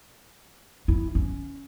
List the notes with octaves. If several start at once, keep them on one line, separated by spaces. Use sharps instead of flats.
E4
C#4